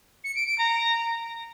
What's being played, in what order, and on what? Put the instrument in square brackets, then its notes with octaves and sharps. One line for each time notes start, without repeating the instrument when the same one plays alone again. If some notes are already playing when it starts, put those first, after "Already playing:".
[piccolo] C#7
D7
D7
A#5